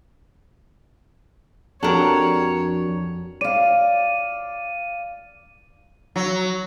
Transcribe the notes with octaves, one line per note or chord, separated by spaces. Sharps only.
F2 D4 F#4 G4 A4 A#4 C#5
D5 F5 D#7
F#3